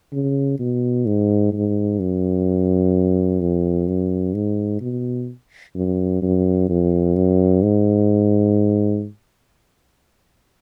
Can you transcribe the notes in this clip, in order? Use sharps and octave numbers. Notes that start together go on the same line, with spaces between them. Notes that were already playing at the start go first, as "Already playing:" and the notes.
C#3
B2
G#2
G#2
F#2
F2
F#2
G#2
B2
F#2
F#2
F2
F#2
G#2